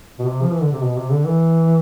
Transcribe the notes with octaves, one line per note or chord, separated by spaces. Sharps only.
B2
C3
F3
E3
D3
C3
B2
C3
D3
E3